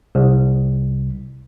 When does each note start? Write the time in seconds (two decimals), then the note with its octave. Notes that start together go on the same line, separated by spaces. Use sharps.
0.15 C2